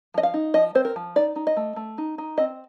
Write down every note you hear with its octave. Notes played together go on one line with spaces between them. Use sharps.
F3 D#5
F5
D#4
F3 D#5
C4 C5
A#4
F3
D#4 D5
D#4
D#5
A3
A3
D#4
D#4
C4 D#5